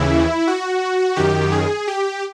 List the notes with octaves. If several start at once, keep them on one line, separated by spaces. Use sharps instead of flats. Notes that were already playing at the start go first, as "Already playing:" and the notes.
Already playing: D#2 C#3 E3 E4
F#4
F#2 D#3 G4
G#4
G4